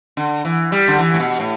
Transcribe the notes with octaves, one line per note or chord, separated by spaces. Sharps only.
D3
E3
G3
D3
E3
A2
B2
A2